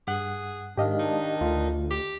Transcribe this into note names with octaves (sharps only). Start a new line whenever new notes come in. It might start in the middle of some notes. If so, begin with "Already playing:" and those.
G2 G#4 F#5 F#6
G#2 D#3 D4 G4 D#5 F5
D#4
D2 A3 F4
G4